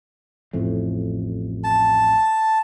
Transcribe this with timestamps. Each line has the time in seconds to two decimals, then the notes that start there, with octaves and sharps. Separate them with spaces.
0.53 A1 F2 A2
1.64 A5